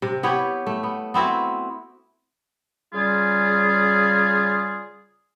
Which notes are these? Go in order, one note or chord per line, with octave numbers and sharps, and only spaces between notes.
C3
B3 E4 G4 C#5
A3
B3
B3 C4 E4 F#4
C#3 G3 F4 G#4